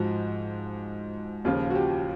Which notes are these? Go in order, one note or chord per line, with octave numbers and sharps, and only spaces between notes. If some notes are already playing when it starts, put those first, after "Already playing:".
Already playing: G#2 F3 F#4
D#2 C#3 F3 F4
F#4
G4